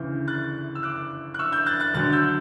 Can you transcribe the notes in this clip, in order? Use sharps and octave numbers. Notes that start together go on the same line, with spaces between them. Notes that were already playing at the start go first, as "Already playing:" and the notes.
Already playing: D2 C#3 E3 G6
F#6 A6
E6
D6 F#6
F#6
C#6 E6
E6 G6
F#6 A6
F#6 A6
D2 D3 F#3 F#6 A6
E6 G6